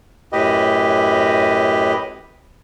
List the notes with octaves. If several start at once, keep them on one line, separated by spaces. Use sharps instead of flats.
F#2 A2 G4 B4 D#5